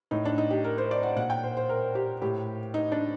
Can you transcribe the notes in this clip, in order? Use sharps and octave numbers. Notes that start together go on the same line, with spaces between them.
A2 D#4
D4
D#4
G4
A#4
C5
D5
F#5
A#2 F#5
G5
C5
C5
A#4
G4
A2 G4
D#4
D4